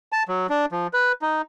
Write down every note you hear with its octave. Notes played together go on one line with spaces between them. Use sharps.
A5
F#3
D4
F3
B4
D#4